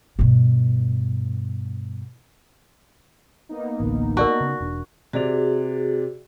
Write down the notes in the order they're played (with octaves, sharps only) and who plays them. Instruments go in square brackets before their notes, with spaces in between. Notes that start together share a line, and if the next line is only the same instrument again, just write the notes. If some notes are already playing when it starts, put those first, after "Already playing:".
[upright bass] G2 B2
[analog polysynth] A#3 B3 D#4
[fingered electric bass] A1 D2
[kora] F#4 [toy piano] A#4 D5 A5
[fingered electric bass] C#3
E1 D4
[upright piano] C3 D5 F7 [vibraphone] F#4 G#4